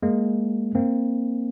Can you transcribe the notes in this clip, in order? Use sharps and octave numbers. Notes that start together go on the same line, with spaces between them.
G#3 A#3
A#3 C4